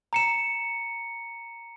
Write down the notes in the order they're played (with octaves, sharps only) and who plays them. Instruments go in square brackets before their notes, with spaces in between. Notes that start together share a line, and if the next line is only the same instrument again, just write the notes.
[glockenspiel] A#5 C#7 E7